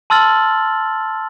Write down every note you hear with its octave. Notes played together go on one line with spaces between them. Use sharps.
A5 C6 E6 F6 A6 F#7